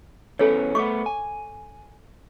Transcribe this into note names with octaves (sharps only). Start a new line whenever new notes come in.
E3 B3 C#4 A4 C#5
A3 B3 C#6 D6
G#5